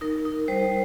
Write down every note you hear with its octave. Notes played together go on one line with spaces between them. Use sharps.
D#4 A#4
D#4
G3 C5